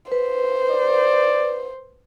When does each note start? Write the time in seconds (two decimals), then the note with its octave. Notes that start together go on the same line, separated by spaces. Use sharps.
0.12 B4 C5
0.71 D5